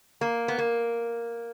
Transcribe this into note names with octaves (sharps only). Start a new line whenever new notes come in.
A#3 A#5
B3
A#3 A#4